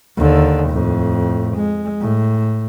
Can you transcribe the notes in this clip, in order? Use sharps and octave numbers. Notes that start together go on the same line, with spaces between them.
D#2 D3
F2 A2
G#3
A2